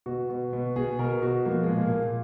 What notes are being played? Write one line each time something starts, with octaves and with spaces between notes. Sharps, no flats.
B2 F#4
B2
B2
B2 G#4
B2 A#4
B2 F#4
F3 A#3
G#3
A#2
A#3
A#2